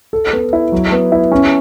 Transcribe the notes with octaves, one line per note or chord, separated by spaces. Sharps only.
A4
B3
E4
F#3
B3
E4
C#4